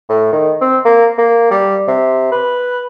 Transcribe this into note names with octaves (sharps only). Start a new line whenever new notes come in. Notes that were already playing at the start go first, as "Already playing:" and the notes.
A2
D#3
C4
A#3
A#3
G3
C3
B4